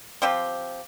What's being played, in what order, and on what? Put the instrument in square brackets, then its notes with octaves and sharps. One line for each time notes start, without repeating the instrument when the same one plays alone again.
[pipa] F3 C4 F4 G4